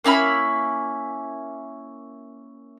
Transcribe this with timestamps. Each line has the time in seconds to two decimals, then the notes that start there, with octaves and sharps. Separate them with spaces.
0.04 A#3 C#4 E4 B5